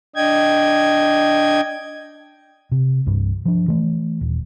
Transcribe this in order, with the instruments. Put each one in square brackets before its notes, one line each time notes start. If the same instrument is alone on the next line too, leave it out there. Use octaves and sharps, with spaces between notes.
[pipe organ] D4 D#5 G5 G#6
[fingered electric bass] C3
C2 G2
F3 D4
E3 A3
D#1